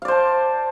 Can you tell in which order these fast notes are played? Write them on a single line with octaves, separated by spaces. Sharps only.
F5 D5 C5 A5